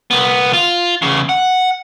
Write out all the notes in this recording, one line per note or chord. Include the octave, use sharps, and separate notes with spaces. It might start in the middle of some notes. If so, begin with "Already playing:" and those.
C2 B3
F4
E2 C#3
F#5